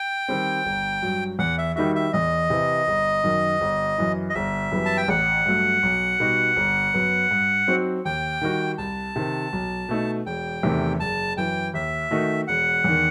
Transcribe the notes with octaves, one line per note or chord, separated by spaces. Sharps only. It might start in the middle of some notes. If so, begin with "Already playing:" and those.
Already playing: G5
D#3 G3 C4
G1
G2 F#3
E2 F#5
E5
D#3 G3 D#4 F#4 E5
E5
E2 D#5
C3 E3
G1
F#2 D#3
G1
F#2 E3
D#5
G1 E5
F#2 E3 G3 B3
A5
G5
A1 F#5
G2 F#3 A3
B1
B2 G3 D#4 F#4
G1
F#2 F#3 B3
G2
F#3 C4 D#4 F#4
D#2 G5
D#3 G3 D#4 F#4
C2 A5
C3 D#3
B1
B2 A3 D#4
E1 G5
E2 C3 D#3 A3
F#1 A5
F#2 E3 G5
D#2 E5
D#3 A3 D#4 F#4
E1 F#5
E2 D#3